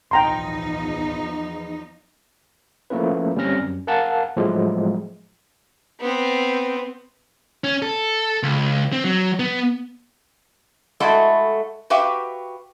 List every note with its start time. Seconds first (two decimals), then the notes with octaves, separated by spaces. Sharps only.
0.11 D1 B1 E2 F3 D#4 G5 A#5 C6
2.90 F3 A3 A#3 C#4 E4 B4
3.36 G1 G3 C4 C#4 F6 A#6
3.60 F#2
3.87 A#4 F5 F#5 G#5 A5
4.37 A2 F3 F#3 G#3 A3
6.00 B3 C4
7.64 C#4
7.82 A4
8.43 C#2
8.93 C4
9.04 F#3
9.39 B3
11.00 G#3 A3 E4 F#4 A4 D#5
11.90 F#4 G4 B4 E5 F5 G5